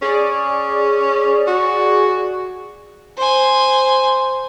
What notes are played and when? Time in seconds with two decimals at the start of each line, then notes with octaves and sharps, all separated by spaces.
0.02 C#4 G#4 D5
1.47 F#4
3.18 C5 G#5